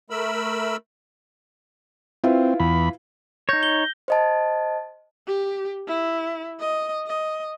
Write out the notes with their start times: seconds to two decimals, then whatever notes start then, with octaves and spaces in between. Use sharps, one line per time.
0.10 A3 A#4 B5 E6
2.24 C4 E4 F4 B4
2.60 E2 B5
3.49 D#4 C#5 G6 A#6
3.63 G7
4.08 C5 D#5 A5
5.27 G4
5.88 E4
6.60 D#5
7.06 D#5